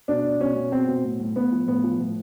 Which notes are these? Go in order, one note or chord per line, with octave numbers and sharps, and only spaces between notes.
B2 D4
B2
B2 C#4
B2
B2 C4
B2
A2
A2
A2 B3
F3
A2 B3
F3
A2